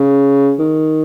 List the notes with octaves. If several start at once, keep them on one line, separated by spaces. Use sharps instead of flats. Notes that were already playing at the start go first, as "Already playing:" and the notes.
Already playing: C#3
D#3